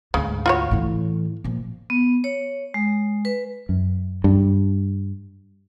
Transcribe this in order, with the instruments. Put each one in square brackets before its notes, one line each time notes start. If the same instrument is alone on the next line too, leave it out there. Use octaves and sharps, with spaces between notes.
[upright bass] D2 G#2 [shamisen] C#3
[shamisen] F4 F#4 C#5
[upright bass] A2 E3
A#2 F3
[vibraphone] B3
C#5
G#3
B4
[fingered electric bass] F#2
G2